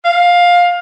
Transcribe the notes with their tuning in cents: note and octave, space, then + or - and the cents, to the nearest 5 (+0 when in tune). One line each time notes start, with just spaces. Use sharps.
F5 +15